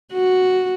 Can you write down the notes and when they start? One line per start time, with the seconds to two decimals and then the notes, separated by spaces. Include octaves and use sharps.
0.13 F#4